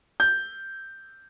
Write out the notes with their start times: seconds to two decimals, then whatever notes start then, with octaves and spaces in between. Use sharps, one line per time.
0.20 G6